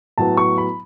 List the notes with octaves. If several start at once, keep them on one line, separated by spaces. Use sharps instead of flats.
A2 F#3 B3 A5
C#6
B5